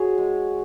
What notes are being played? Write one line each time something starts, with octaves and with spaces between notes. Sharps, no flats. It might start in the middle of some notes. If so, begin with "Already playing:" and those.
Already playing: D#4 F#4 G#4 C#5
G#3